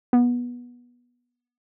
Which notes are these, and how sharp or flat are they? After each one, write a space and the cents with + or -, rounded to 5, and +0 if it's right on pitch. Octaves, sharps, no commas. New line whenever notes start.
B3 -20